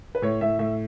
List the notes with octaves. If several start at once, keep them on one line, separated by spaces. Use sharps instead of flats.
B4
A2 C#5
A2 E5
A2 E5